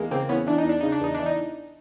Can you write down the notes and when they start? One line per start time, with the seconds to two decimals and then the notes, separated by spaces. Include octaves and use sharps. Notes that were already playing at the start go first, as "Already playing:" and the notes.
Already playing: E2 G#3 A#3
0.11 C#3 A#3 C4
0.29 E2 B3 C#4
0.46 E3 D4
0.58 D#4
0.65 E2 D4
0.81 C#3 D#4
0.92 D4
1.01 E2 D#4
1.14 E3 D4
1.26 D#4